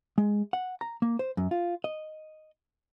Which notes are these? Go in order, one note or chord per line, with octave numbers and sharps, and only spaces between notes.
G#3
F#5
A#5
A#3
C5
F#2
F4
D#5